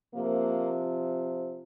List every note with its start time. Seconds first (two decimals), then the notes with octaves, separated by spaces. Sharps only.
0.14 C3 F3 A#3